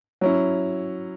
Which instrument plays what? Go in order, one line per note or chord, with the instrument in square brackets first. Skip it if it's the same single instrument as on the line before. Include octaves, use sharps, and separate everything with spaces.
[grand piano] F#3 C#4 E4